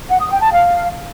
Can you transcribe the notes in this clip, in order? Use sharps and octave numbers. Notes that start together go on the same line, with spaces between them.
F#5
D#6
G5
A5
F5